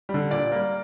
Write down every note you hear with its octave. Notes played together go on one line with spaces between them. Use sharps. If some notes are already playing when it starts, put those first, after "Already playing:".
G3
D3
A#2 D5
G3 A#3